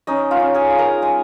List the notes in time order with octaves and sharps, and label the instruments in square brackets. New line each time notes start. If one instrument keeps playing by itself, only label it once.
[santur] C#4 D#4 D#5
F4 F5
C#4
G#4 G#5
F4
A#4 A#5
G#3 G#4 G#5